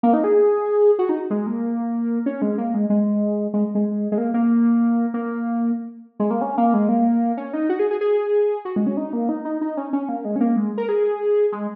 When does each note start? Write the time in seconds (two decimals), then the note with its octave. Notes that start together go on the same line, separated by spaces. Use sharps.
0.03 A#3
0.13 D#4
0.24 G#4
0.99 F#4
1.09 D#4
1.30 G#3
1.47 A#3
2.26 C#4
2.42 G#3
2.58 A#3
2.74 G#3
2.90 G#3
3.54 G#3
3.75 G#3
4.12 G#3
4.18 A#3
4.34 A#3
5.14 A#3
6.20 G#3
6.31 A#3
6.41 C#4
6.58 A#3
6.74 G#3
6.89 A#3
7.37 C#4
7.53 D#4
7.69 F#4
7.79 G#4
7.91 G#4
8.01 G#4
8.65 F#4
8.76 G#3
8.86 C#4
8.97 D#4
9.13 A#3
9.29 D#4
9.45 D#4
9.61 D#4
9.77 C#4
9.93 C#4
10.09 A#3
10.25 G#3
10.36 C#4
10.41 A#3
10.56 G#3
10.78 A#4
10.89 G#4
11.52 G#3